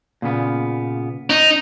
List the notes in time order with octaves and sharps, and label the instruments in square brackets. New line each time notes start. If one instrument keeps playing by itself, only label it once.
[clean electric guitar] A#2 C#3 B3
[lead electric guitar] D#4